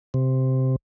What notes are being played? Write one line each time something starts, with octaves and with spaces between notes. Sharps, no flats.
C3